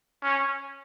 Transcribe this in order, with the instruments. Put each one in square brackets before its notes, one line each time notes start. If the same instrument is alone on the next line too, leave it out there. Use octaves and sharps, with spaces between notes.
[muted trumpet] C#4